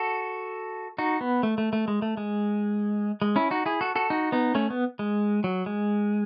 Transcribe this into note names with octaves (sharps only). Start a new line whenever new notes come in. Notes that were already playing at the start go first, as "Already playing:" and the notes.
Already playing: F#4 A4
D#4 F#4
B3
A3
A3
A3
G#3
A3
G#3
G#3
C#4 E4
D#4 F#4
E4 G#4
F#4 A4
F#4 A4
D#4 F#4
B3 D#4
A3 C#4
B3
G#3
F#3
G#3